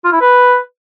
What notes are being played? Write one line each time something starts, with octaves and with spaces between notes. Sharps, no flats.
F4
E4
B4